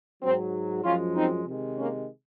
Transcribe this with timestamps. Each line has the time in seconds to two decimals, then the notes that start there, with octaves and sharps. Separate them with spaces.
0.22 G#2 F#3 C4
0.83 F#2 F3 G#3 C#4 F4
1.15 C4 D#4
1.46 C3 D#3 G#3
1.76 A#3 C#4